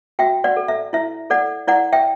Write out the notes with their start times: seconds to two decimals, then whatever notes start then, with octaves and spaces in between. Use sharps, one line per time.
0.19 F#4 E5 G5
0.44 D5 F#5
0.57 A4
0.68 E5
0.93 E4 E5
1.30 A4 D5 F#5
1.67 E4 D5 F#5
1.93 E5 G5